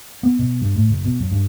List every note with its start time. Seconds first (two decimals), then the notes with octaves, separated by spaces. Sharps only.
0.23 B3
0.39 B2
0.61 G2
0.76 A2
0.90 F#1
1.04 B2
1.20 F#2
1.32 G2